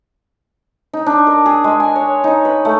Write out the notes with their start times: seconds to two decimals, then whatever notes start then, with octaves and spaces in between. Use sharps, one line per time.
0.93 D#4
1.06 D4
1.27 A#4
1.46 G#4
1.64 G#3
1.80 G#5
1.95 C#5
2.24 D#4
2.45 B4
2.65 A3